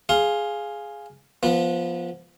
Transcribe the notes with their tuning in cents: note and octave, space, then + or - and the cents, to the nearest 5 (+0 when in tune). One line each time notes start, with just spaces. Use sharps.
G#4 +0 F5 +0 C6 +15
F3 +0 B3 -20